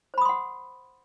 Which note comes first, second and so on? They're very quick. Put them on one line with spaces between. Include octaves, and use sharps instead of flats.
C5 B5 D#6 C6 F#5